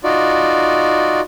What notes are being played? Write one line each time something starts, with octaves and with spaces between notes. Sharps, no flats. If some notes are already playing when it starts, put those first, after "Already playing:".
D#4 F4 F#4 D5